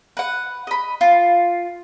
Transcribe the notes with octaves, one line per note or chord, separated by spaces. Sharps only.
B4 F#5
D#5 B5
F4